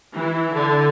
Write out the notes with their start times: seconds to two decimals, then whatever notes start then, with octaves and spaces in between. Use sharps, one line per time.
0.14 E3 E4
0.53 D3